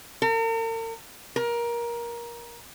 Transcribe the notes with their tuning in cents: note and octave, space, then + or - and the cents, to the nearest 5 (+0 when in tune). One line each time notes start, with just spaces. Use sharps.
A#4 -45
A#4 +20